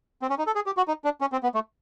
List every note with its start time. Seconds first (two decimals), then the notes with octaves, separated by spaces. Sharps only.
0.22 C4
0.30 C#4
0.38 D#4
0.47 A4
0.55 G#4
0.66 G4
0.77 F#4
0.88 D#4
1.04 D4
1.21 C#4
1.32 C4
1.43 B3
1.54 A3